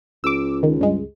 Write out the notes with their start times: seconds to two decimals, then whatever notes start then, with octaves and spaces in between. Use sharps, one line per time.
0.24 C#2 D6 E6
0.63 D#3
0.81 G2 G#3